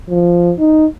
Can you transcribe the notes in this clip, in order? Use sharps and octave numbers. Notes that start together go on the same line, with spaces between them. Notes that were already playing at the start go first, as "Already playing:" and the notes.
F3
D#4